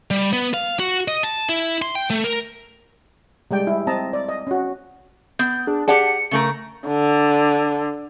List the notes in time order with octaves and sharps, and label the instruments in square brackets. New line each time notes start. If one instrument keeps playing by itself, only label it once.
[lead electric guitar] G3
B3
F5
F#4
D#5
A5
E4
C6
G5
A3
A#4
[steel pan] G3 G#3 D5 G5
E4
C4 D#5 A5 A#5
D5
D#5
C#4 F#4
[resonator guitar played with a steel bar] B3 [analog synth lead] G6
[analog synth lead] D4 [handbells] G#4
[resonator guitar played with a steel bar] G4 F#5 A5 [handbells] G#4 D5 G5 [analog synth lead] C#7
[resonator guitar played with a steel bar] C#3 A3 A#4
[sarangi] D3